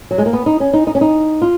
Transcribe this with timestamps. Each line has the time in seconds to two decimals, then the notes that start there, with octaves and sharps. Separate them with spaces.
0.11 F#3
0.18 G#3
0.26 A#3
0.33 B3
0.46 D#4
0.60 C#4
0.73 D#4
0.87 D#4
0.95 C#4
1.01 D#4
1.42 F4